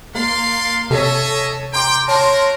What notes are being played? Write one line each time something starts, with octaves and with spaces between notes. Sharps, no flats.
A#3 D5 F5 C6
C3 G#4 A4 C#5 D#5 E5
G5 A#5 C6 D6
C4 F#4 A#4 C#5 A5 C6